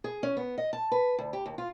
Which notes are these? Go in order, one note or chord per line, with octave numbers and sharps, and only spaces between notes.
G#4
C#4
B3
D#5
A5
B4
D2
G4
D#2
F4